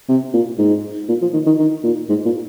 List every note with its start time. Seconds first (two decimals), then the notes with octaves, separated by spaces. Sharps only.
0.09 C3
0.34 A#2
0.58 G#2
1.09 A#2
1.22 F3
1.33 D#3
1.46 D#3
1.59 D#3
1.84 A#2
2.09 G#2
2.25 A#2